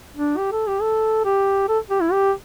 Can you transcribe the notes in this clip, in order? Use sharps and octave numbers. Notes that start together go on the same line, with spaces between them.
D4
G4
A4
G4
A4
G4
A4
G4
E4
G4